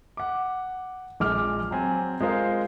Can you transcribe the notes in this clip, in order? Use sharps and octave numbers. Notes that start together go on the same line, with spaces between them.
F#5 D6
A#1 G#3 D6 F6
F#3 C4 G#5
G#3 F4 G#4 A#4 C5 F5